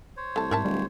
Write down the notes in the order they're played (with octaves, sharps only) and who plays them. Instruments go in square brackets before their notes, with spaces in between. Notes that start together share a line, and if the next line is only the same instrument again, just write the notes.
[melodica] C5 C#5
[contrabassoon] C2 [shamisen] A3 A5
[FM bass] G#2 [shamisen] A#4 E5 A5
[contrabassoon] D1 [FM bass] G3